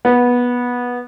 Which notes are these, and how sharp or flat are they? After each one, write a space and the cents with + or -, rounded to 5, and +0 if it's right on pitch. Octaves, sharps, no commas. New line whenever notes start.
B3 -15